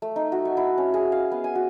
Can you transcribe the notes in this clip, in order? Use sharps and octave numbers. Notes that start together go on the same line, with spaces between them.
A3
D#4
F#4
C#6
E4
C#4
G#4
F5
B3
G#5
F#4